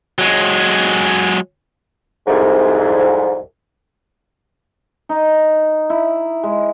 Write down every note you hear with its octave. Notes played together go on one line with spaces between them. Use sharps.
F#3 G#3
C2 F2 G#2
D#4
E4
G#3